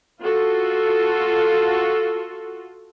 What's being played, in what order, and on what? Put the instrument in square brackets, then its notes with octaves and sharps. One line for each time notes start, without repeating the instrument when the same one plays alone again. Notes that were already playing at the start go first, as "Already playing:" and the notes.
[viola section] F4 F#4 A4